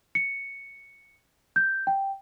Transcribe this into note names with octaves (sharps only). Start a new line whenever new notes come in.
C#7
G6
G5